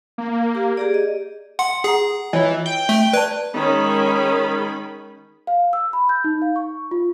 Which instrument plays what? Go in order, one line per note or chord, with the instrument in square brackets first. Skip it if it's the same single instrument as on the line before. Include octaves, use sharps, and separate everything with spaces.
[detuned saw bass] A#3
[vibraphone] G4
G4 G#4 D5
D#5
[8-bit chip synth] F#5 [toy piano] C6
[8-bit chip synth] G#4 [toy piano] F#5 A#5
[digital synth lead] E3 [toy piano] F4 C#5 D#5
[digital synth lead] G5
[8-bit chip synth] A3
[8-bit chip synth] B4 [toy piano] D5 A5
[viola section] D#3 G#3 C#4 B5
[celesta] F5
E6
B5
G6
D#4
F5
C#6
F4